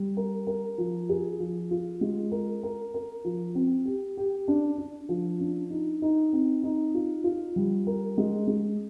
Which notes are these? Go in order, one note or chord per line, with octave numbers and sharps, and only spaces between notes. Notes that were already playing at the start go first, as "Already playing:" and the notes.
Already playing: G3
A#4
A#4
F3
G#4
F3
F4
G#3
A#4
A#4
A#4
F3
C4
G4
G4
D4
D4
F3
D4
D#4
D#4
C4
D#4
F4
F4
G3
A#4
G#3
G#3